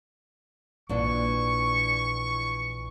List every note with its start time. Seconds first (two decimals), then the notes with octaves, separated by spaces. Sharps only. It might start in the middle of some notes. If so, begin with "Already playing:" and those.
0.89 A#1 A#2 E3 D4 C#6